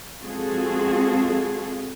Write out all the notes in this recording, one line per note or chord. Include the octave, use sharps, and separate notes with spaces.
G#3 C4 F4 F#4 G#4 A4